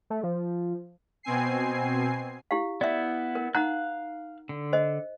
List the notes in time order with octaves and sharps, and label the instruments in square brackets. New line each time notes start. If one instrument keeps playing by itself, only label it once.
[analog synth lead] A3
F3
[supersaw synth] B2 C4 G#5 C7
[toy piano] E4 G4 F5
[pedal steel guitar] B3 E4 [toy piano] D5 E5
[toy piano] A#4
[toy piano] D#4 F#5 A#5 [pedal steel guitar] F5 F#6
[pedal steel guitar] D3
[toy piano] C5 D#5